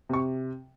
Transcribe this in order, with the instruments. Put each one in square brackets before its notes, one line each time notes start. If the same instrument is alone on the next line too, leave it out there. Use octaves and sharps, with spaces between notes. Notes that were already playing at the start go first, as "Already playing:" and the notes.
[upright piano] C3 C#6